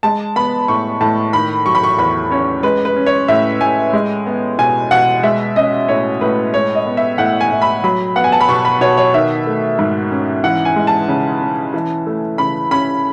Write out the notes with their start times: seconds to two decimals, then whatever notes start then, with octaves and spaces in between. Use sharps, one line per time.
0.03 G#3 A5
0.36 B3 B5
0.68 A2 C#6
1.01 A2 A5
1.33 D#3 B5
1.66 F#3 C#6
1.75 B5
1.83 C#6
1.98 E2 B5
2.31 C#4 C#5
2.63 G#3 B4
2.85 B4
2.96 C#4
3.06 C#5
3.28 A2 E5
3.61 A2 G#5
3.93 G#3
4.26 B3
4.58 B2 G#5
4.91 B2 F#5
5.23 G#3 E5
5.56 C#4 D#5
5.88 A2 C#5
6.21 A2 B4
6.54 G#3 C#5
6.75 D#5
6.86 B3
6.97 E5
7.18 A2 F#5
7.41 G#5
7.51 A2
7.62 B5
7.84 F#3 B5
8.16 B3 F#5
8.24 G#5
8.32 A5
8.41 B5
8.48 B2 C#6
8.65 B5
8.81 B2 C#5
8.97 C#5
9.14 D#3 E5
9.47 A3
9.79 G#2
10.11 C#4
10.44 E3 F#5
10.65 G#5
10.76 G#3
10.87 A5
11.08 C#3
11.42 C#4
11.74 E3
12.06 A3
12.38 C#3 B5
12.71 C#4 B5